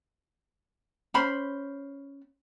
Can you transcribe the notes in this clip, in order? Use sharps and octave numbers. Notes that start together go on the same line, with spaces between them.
C#4 C5 B5